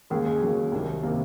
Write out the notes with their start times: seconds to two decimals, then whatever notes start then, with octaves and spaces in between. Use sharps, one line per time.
0.10 D#2 C#3 G#3
0.26 G#3
0.41 D#2 C#3 F#3
0.72 C2 C3 D#3
1.03 C3 D#3 A#3